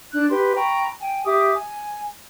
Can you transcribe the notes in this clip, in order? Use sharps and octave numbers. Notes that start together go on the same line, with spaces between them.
D4 D5 F#6
G4 B4 C6
G5 A#5 B5 C#6
G5 G#5
G4 E5 D6 D#6
G#5